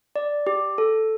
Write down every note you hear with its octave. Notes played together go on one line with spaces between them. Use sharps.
D5
G4
A4